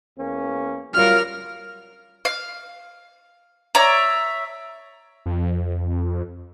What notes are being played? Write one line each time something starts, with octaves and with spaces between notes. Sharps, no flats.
E2 A#3 C#4
F#3 G3 F4 A#4 F6
F5
C#5 D5 E5 A#5
F2